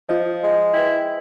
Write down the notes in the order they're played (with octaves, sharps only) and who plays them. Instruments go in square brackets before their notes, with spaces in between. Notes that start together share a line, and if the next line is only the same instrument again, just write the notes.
[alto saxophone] F3 [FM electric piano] F4 D#5
[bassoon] G#3
[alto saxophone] E4 [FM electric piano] B4 G5